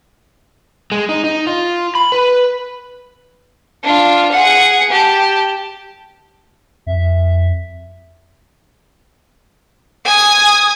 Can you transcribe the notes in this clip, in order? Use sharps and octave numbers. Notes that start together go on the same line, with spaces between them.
G#3
D#4
D#4
F4
B5
B4
D4 F4
G#4 F#5
G4 A5
F2 E5
G#5 D#6